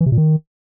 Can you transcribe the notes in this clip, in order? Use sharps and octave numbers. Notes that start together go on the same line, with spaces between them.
E3
C3
A#2
D#3